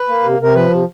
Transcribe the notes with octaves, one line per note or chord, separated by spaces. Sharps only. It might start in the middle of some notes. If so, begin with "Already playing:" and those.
Already playing: B4
A#3
C3
C3 A#4
F3 B4
C3